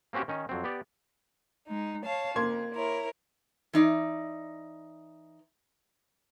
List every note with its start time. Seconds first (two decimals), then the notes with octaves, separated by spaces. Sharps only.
0.13 A#3 C4 C#4 F#4 G4
0.28 D#3 C#4 D#4
0.49 F2 F#3 C4
0.64 B3 G4 D5
1.68 G#3 D#4
2.05 C#5 F5 A5
2.36 F2 A#3 C6 G#6
2.75 E4 A#4 C#5
3.73 E3 D#4 D5